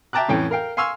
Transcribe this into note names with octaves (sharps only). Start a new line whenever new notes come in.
E5 G5 A5 A#5 D6 F#6
F2 A2 E3 C#4 G5
A#4 F5 G5
F5 G#5 C6 C#6 E6 F6